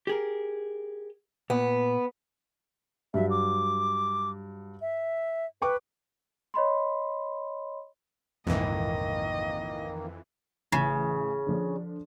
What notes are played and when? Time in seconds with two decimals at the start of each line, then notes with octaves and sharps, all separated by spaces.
0.07 G4 G#4 A#4
1.50 A#2 B3
3.14 G2 F#3 E5
3.30 D6
4.81 E5
5.62 B4 G5 C#6 D6
6.54 C#5 D#5 B5 C6
8.47 F1 A#1 F2 G#2 D#3 E3 A#3 D#5
10.72 A1 C#3
11.47 D3 F3 D4